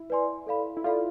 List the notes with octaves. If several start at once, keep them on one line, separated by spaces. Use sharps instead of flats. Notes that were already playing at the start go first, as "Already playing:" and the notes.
Already playing: E4
B4 D5 G#5 C6
A4 D5 F5 B5
E4
F4 A4 D5 F5 B5